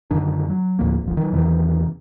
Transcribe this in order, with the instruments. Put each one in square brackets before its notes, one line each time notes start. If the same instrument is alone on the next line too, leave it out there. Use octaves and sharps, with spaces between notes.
[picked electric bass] F#2 D3 D#3 D4
F#3
D2 A2 F3 A#3
D1 G#1 F3
D#3 F#3
E2 C3 D#3 E3